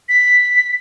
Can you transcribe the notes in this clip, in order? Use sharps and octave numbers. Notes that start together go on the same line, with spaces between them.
B6